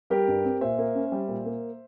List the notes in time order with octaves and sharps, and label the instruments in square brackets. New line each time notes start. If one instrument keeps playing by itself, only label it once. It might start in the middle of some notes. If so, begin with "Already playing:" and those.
[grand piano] G3 G4 A#4
G2
C4
A#2 C5 E5
A#3
C#4
G3
A#2
A#3